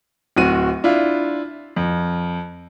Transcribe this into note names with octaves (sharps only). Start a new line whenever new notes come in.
D1 C4 F#4 D#7
D4 E4 F4
F2